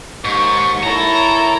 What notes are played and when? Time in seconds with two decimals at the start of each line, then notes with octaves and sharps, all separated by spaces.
0.25 D#2 G#2 C#6
0.83 E4 A4 A#4 C#5 A#5